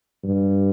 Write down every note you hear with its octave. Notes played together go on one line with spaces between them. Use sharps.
G2